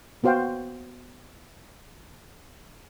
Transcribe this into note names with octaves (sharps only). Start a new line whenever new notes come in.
A#3 B3 F#4 C5 F5 G5